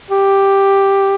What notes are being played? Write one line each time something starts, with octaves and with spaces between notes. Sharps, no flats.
G4